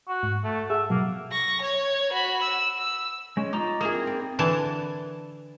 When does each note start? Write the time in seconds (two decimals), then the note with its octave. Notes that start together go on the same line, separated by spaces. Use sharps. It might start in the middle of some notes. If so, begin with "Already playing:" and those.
0.09 F#4
0.23 G#2
0.44 A3
0.70 G#4 E5 F#5
0.90 B2 F#3 A#3
1.32 C#6 A#6
1.62 C#5 G#6
2.13 F#4 B5
2.42 E6 E7
2.78 E6
3.37 G#3 C#4
3.53 D#4 F4 A#5 D6
3.81 A#3 E4 G#4 D#6
3.94 C4
4.07 D5
4.39 D3 E3 G#5 A5